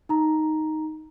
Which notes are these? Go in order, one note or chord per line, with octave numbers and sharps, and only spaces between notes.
D#4 A#5